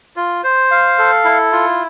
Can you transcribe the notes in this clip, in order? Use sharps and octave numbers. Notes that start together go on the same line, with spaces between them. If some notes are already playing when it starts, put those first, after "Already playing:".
F4
C5
F5
A4
E4
F4